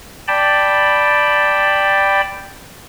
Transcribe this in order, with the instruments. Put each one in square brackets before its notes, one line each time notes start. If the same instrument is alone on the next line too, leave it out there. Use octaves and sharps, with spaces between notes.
[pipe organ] D5 G5 A5 B5